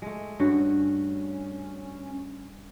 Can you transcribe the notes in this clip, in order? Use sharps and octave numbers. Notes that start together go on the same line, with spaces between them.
G#3 A3
G2 C#4 F#4